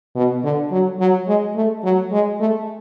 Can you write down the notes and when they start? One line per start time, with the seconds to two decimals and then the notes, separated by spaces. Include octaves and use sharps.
0.15 B2
0.43 D3
0.71 F#3
1.00 F#3
1.28 G#3
1.56 A3
1.84 F#3
2.12 G#3
2.40 A3